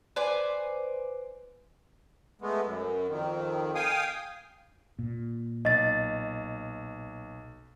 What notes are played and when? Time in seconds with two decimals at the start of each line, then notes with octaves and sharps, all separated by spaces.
0.16 B4 C5 D5 G#5
2.42 G#3 A3 B3
2.65 F#2
3.08 F2 D#3
3.75 F5 G5 G#5 D#6
4.99 A#2
5.65 B1 D#5 A6